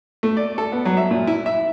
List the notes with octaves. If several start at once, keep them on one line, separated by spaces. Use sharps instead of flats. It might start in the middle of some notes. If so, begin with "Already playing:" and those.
A3
D5
A4
B3
F#3
E5
A#2
E4
E5